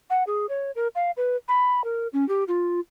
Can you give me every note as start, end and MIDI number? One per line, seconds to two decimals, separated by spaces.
0.10 0.23 78
0.27 0.46 68
0.49 0.71 73
0.76 0.88 70
0.95 1.11 77
1.17 1.36 71
1.48 1.84 83
1.84 2.07 70
2.13 2.27 61
2.29 2.44 67
2.48 2.80 65